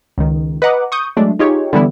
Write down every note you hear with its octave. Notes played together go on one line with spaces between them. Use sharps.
C#2 D#3
B4 D#5 F#5 A#5 D6
C#6 D#6 G6
F#3 G#3 A3 D4
D#4 F4 G4 G#4 C#5
D3 E3 G3 B3 E4